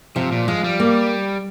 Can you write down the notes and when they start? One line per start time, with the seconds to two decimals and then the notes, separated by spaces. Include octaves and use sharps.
0.16 C3 F3
0.32 A#2
0.48 F3 G#3
0.64 G3
0.80 A#3